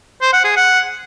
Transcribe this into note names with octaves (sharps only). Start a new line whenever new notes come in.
C5
F#5
G#4
F#5